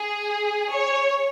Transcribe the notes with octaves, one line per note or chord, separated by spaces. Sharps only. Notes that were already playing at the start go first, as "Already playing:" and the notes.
Already playing: G#4
C#5